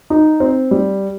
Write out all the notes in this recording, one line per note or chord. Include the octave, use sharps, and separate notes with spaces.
D#4
C4
G3